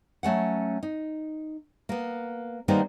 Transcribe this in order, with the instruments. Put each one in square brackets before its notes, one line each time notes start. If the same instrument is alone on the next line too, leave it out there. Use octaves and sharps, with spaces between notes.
[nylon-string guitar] F#3 A3 C#4 F#5
D#4
A#3 B3
D#3 G3 A#3 B3 D#4 C5